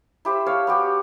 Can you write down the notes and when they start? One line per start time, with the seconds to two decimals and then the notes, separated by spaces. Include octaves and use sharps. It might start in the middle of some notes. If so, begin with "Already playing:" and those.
0.25 E4 G4 C5 E5
0.46 C#5 F5 A5 E6
0.67 B3 F#4 G4